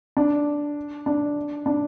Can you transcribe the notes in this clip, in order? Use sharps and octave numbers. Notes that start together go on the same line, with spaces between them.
D4
D4
D4